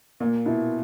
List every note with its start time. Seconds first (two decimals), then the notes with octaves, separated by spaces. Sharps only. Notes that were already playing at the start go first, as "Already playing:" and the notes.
0.20 A#2 A#3
0.46 B2 E4